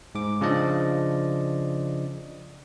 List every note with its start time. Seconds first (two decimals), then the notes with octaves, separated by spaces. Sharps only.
0.15 G#2 D6
0.41 C#3 F3 D4 D5 D#5